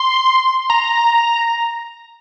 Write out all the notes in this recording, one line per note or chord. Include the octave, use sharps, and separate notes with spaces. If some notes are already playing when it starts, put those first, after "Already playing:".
Already playing: C6
A#5